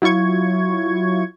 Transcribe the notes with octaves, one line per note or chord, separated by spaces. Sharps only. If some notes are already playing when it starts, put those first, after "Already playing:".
F#3 E4 F4 C#6 G#6